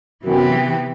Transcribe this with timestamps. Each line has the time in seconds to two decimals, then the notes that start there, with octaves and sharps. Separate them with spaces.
0.24 F#2 C3 E3 B3 E4 G4